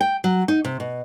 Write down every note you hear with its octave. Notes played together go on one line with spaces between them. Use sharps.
G5
F#3
D#4
C3
B2